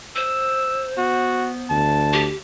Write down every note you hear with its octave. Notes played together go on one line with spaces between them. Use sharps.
C5 E6
B3 F#4
D2 A5
G4